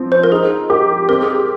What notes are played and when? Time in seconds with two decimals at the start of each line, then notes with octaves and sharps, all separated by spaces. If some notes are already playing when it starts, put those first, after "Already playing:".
Already playing: F3 C4
0.12 C5
0.24 A#4
0.32 D#4 G#4
0.70 G4 A#4
1.09 C4 A#4
1.22 G#4
1.28 A#4